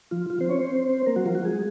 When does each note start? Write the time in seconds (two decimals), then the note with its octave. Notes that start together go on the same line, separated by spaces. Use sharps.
0.11 F3 F4
0.30 F3 F4
0.40 C4 C5
0.49 C#4 C#5
0.59 C4 C5
1.06 A#3 A#4
1.16 F#3 F#4
1.26 F3 F4
1.35 F#3 F#4
1.45 G#3 G#4